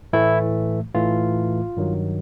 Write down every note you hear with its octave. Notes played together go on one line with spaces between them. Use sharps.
A2 E3 A3 E4
A2 E3 A3 F4
G2 D#3 F#3